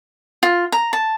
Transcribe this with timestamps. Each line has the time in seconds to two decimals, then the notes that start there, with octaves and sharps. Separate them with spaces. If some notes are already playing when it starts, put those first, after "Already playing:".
0.43 F4
0.72 A#5
0.93 A5